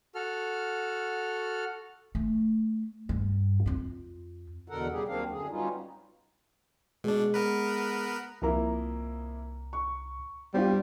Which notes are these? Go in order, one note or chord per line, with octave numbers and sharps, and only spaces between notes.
F#4 A4 F6
A3
G2
F2 F4
E2 B2 D3 A4 A#4 F#5
C#3 G3 G4 G#4
D#2 F#3 A#3 C4 D4 F5
F#2 D3 G#4
F#3 G3 B3 C#4 D#4 F4
B2 G#3 D4
B3 A#4 B4
C2 F2 A#3 E4 A#5
C#6
G3 B3 D4 F4 G4 C5